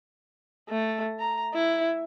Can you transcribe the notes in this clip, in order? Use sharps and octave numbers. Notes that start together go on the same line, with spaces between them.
A3
A#5
E4